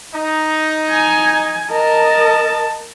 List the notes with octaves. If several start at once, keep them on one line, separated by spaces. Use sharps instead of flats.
D#4
G#5
A#4 D#5 A5